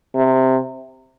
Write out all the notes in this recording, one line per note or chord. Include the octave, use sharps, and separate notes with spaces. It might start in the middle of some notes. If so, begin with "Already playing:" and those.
C3